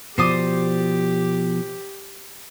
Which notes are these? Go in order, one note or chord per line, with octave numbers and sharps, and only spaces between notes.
B2 F3 G4 C5 D5 D6 D#6